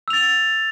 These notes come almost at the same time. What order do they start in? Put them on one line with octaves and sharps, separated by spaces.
E6 F7 A6